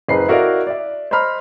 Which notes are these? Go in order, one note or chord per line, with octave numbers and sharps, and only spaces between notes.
F#1 G#4 B4 D#5 C7
E4 F#4 A#4 D5 D#5 F5
D5 E5
C5 D#5 A#5 B5 F6